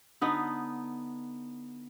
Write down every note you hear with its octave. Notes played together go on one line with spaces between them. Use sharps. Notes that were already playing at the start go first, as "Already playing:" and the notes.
D3 B3 D#4